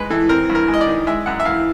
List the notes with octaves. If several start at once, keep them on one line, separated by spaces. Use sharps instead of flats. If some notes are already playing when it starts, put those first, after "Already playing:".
Already playing: G#2 G#3 B4
E3 A4
C4 A#4
G2
A#4
G#3
D#5
D5
D#3
G#3 E5
F#2 F#5
E5
E3 F5